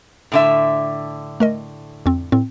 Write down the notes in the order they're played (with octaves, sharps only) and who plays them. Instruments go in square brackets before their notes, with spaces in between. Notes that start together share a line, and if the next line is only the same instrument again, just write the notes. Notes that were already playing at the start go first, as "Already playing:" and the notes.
[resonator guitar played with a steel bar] A2 D3 E5
[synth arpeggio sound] A3 A#4 D#5
F2 C4
A2 C4